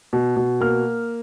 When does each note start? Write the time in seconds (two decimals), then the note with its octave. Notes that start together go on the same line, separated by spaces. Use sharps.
0.13 B2
0.37 B2
0.61 A#3 F6